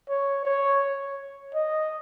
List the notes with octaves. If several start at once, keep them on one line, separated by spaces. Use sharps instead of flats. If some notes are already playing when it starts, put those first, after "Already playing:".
C#5
C#5
D#5